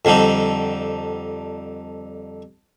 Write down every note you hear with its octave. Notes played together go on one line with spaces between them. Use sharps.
F2 D3 G3 D4 D#4